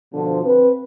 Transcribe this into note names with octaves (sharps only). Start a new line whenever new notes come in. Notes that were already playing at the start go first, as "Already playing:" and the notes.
B2 D3 F3
C4 B4